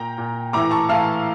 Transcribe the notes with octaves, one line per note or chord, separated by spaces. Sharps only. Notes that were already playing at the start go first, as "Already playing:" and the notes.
Already playing: A#2 G5 A#5
A#2
A2 E3 A#5 D6
A5 C#6
A2 E3 F5 A5